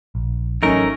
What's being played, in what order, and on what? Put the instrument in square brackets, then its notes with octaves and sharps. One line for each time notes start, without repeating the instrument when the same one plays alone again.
[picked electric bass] A#1
[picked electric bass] A1 F#3 [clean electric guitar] A3 A#4 [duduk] C#4 [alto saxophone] D#4